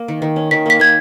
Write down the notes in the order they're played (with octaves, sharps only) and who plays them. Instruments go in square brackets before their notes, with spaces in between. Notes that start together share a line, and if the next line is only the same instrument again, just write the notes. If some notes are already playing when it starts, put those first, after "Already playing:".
Already playing: [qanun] A#3
D#3
D#3
C#4
[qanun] D#3 [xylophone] B6
[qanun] A#3 [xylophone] B6
[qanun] A#3 [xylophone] G#6